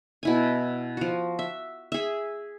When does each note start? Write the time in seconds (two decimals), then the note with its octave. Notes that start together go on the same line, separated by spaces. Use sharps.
0.23 B2 E4 G#5
0.97 F3 F#4
1.39 E5
1.92 G#4 E5